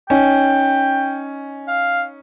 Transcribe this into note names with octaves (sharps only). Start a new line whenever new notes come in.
C#4 D#4 G5
F5